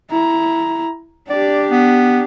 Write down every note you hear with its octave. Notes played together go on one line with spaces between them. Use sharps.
E4 A#5
D4 G4 D5
B3